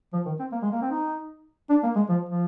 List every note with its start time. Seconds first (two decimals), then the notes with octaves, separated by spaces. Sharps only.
0.13 F3
0.25 D#3
0.39 C4
0.52 A#3
0.62 G#3
0.72 A#3
0.81 C4
0.91 D#4
1.70 D4
1.83 A#3
1.95 G#3
2.09 F3
2.29 F3